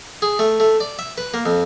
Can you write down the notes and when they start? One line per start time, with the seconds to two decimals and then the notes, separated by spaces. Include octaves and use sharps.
0.22 G#4
0.39 A3
0.60 A3
0.80 D5
0.99 E5
1.18 B4
1.34 A#3
1.46 F2